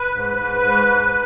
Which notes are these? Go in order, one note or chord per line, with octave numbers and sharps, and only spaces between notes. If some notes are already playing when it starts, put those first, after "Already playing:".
Already playing: B4
G#2
G#2
G#2
G#2